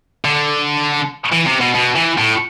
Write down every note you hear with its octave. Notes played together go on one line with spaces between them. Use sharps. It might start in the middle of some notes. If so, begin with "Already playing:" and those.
D3
E3
C3
B2
B2
E3
A2